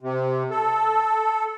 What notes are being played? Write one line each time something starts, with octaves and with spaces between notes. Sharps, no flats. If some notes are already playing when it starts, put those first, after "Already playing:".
C3
A4